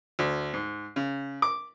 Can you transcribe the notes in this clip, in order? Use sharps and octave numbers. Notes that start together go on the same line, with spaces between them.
D2
G#2
C#3
D6